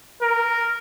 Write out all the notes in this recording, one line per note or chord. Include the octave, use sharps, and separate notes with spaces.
A#4